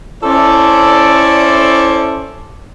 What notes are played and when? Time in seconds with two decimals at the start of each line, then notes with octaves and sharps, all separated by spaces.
0.23 C#4 E4 A4 C5 D5